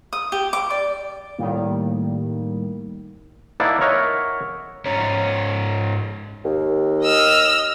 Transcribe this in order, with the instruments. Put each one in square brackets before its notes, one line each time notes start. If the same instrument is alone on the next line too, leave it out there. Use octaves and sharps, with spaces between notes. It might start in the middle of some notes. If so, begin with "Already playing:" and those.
[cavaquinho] D#6
G4
D6
D5
[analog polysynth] A2 D#3 G3 A#3
[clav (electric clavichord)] A#3 D#4 E4 D5 F#5 A5
A#4 C#5 D#5 E5 F#5
[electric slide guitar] G#2 C#4 C#5 A#5
[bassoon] D#2
[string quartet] D#5 E6 F6